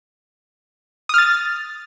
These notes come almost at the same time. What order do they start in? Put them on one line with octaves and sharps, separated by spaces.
D#6 F6 A6